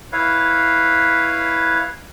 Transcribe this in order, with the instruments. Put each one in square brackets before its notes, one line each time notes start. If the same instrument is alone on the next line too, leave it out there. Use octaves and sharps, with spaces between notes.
[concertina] E4 B4 C#5 F5